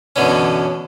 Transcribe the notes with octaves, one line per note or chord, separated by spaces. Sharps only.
F#2 B2 D3 E3 C#4